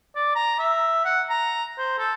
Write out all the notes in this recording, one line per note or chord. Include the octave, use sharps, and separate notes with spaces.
D5
A#5
E5
F#5
A#5
C5
A4